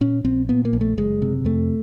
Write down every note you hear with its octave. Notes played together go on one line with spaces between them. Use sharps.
A#2 C#4
A#1 C4
A#2 B3
A#3
A#1
A3
F#1 G#3
C3
F2 A3